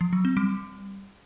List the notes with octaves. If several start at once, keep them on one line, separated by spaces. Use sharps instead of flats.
F3
F#3
C4
G3